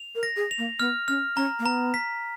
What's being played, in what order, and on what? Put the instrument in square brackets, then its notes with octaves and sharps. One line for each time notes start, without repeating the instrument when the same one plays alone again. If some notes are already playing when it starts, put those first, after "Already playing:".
Already playing: [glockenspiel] F7
[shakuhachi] A#4
[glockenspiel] A#6
[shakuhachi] G#4
[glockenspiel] F7
[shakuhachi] A#3
[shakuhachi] B3 [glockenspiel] F6
[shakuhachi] C#4 [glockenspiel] F6
[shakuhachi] C#4 [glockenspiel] A#5
[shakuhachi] A#3
[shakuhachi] B3 [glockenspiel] A#5
[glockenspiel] B6